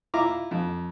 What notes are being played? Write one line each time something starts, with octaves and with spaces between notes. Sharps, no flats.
E4 F4 A#5 D6
F2